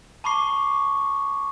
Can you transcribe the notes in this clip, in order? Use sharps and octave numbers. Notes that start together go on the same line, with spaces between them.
A5 B5 C#6 D6 C7